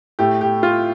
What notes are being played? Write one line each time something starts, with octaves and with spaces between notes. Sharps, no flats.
A2 A3 G4
G4
F4